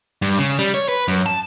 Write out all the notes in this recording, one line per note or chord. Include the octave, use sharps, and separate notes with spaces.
G2
C#3
G3
C#5
B4
F#2
A5